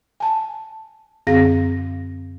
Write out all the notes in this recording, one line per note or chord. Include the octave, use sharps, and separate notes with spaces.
G#5 A5
F#2 D3 C4 G#4 F5 A#6